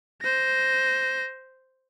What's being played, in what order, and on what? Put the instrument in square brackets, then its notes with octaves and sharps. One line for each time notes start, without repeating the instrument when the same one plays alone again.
[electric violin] C5 A#6